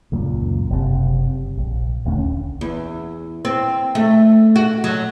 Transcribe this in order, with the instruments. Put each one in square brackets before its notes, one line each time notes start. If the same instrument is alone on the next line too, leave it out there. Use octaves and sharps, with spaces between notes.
[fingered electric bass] C#2 F#2 A#2
F#1 C3
A#1
D#1 D2 C#4
[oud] E2
C4
A3
F#4
F#3